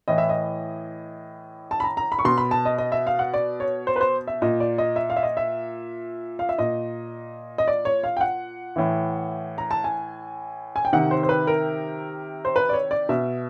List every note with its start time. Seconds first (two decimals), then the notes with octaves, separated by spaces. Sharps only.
0.08 A2 E3 D#5
0.18 E5
0.29 D#5
1.71 A5
1.80 B5
1.84 A#5
1.97 A#5
2.12 B5
2.19 C#6
2.25 B2 C6
2.38 B5
2.51 A5
2.65 D#5
2.78 D#5
2.92 E5
3.07 F5
3.19 F#5
3.34 D5
3.60 C#5
3.87 C5
3.96 B4
4.01 C5
4.27 E5
4.42 A#2 D#5
4.60 D5
4.78 D#5
4.96 E5
5.10 F5
5.16 E5
5.23 D#5
5.37 E5
6.39 F5
6.49 E5
6.58 A#2 D#5
7.58 D#5
7.68 D5
7.85 C#5
8.03 F5
8.17 G5
8.21 F#5
8.76 A2 E3
9.58 A#5
9.71 A5
9.84 G#5
10.76 G#5
10.85 G5
10.93 C3 D#3 F#5
11.11 C5
11.23 C5
11.29 B4
11.47 A#4
12.45 C5
12.56 B4
12.69 D5
12.73 C#5
12.91 D5
13.09 B2 E5